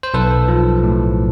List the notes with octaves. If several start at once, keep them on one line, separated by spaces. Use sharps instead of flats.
C5
B1 A4 B4
F3
A2